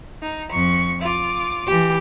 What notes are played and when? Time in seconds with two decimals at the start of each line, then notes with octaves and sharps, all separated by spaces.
0.22 D#4
0.51 F2 C#6
1.01 F4 D6
1.67 E3 G4